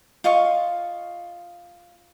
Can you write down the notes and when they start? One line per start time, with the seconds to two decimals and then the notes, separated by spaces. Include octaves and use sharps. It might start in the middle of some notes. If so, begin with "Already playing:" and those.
0.24 F4 D#5 F5 C#6